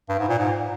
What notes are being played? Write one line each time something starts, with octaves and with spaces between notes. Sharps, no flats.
G2
G#2
A#2
G#2